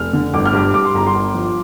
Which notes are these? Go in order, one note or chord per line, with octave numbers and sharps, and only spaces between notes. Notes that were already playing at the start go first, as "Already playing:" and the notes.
Already playing: F1 F6
D3
G1 D6
F6
G2 D6
G2 D6
C6
G1 A#5
C6
G1
F3